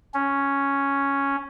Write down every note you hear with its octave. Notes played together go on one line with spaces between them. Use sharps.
C#4